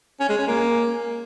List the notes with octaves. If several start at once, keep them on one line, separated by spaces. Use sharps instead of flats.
C#4
G#3
C#4
A#3